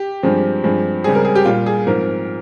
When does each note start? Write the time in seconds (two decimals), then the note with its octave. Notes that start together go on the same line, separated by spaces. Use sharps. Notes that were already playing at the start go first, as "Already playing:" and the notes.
Already playing: G4
0.23 G2 F3 G#3 C4
0.64 G2 F3 G#3 C4
1.04 C#2 C#3 G3 C4 G#4
1.15 A#4
1.25 G#4
1.35 G4
1.45 A#2 G3 A#3 F4
1.66 G#4
1.87 G#2 F3 C4 A#4